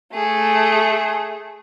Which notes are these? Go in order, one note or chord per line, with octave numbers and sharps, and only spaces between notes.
A3 G#4